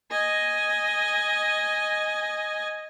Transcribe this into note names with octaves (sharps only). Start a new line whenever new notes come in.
D#5 G#5